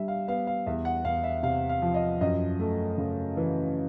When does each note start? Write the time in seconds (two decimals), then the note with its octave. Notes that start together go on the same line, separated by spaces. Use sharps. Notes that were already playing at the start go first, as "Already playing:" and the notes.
Already playing: G3 D4 E5
0.08 F5
0.28 B3 F5
0.47 F5
0.66 E2 E5
0.85 F#5
1.05 E2 F5
1.24 E5
1.43 C3 F5
1.69 F5
1.82 F3
1.94 D#5
2.21 F#2 D#5
2.59 A3
2.98 C#3
3.37 E3